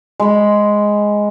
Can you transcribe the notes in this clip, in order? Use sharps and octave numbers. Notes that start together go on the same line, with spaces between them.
G#3 B5